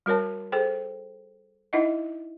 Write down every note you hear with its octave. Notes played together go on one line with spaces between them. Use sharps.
G3 F#4 A#4 C#5 A5
G#4 A4 C5 G5
D#4 E4 D#5 E5 F#5